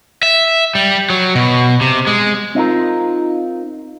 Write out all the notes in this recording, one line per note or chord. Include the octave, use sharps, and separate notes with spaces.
E5
G3
F#3
B2
C3
G#3
C4 D#4 F4 A#4